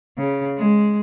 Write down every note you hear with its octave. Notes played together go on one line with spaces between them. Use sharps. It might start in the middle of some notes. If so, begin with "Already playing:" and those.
C#3
G#3